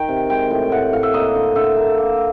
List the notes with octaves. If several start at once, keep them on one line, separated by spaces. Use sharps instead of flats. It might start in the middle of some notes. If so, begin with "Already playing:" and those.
Already playing: D#3 G5
C3
G#3 G5
A2
A2 F#5
A2 F5
E5
A#3 D#5
D3
D3 E5
A#3
A#3